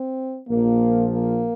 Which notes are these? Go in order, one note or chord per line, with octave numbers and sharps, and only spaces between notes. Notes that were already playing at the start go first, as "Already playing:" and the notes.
Already playing: C4
A#1 A#2 F3 A#3
A#3